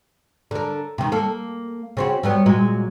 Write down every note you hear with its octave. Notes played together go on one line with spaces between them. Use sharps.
D3 A#4
C3 D#3
A#3 A4
C#3 C4 F#4
F#3 G3 B3
A#2 F#3 G#3